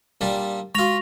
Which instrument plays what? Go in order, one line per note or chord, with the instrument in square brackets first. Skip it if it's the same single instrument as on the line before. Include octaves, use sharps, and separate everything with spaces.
[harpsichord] A#2 G3 D4
[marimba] G#3 F#4 [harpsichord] F4 B5 [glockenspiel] C#6 A#6 F7